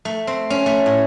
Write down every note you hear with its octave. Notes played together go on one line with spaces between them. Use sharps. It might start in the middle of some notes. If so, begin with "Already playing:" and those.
A3
C4
C#4
A3
A2